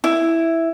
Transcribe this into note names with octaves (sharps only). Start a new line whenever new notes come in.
E4